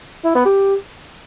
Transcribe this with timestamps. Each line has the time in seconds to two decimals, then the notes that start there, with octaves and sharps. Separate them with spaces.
0.24 E4
0.35 B3
0.45 G4